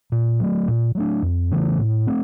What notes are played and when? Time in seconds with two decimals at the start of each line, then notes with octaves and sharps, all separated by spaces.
0.12 A#2
0.40 F#3 A3
0.68 A#2
0.95 F#3 A3 D4
1.22 F2
1.51 C#3 E3 A3
1.79 A2
2.07 A3 C4